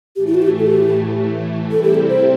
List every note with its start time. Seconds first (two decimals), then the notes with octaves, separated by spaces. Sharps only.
0.16 A2 E3 A3 G4
0.27 E4
0.35 F#4
0.42 G4
0.58 A4
0.67 G4
1.70 C3 G3 C4 E4 A4
1.83 G4
1.95 A4
2.09 C5